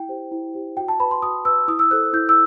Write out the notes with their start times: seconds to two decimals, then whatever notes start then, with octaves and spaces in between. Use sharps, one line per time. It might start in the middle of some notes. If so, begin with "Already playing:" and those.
Already playing: E4 G5
0.09 G4 C5
0.32 E4
0.54 G4 C5
0.77 F#4 G5
0.88 A5
1.00 B4 B5
1.11 C6
1.22 F#4 D#6
1.45 B4 E6
1.68 E4 D#6
1.79 E6
1.91 A4 C5 F#6
2.13 E4 G6
2.29 E6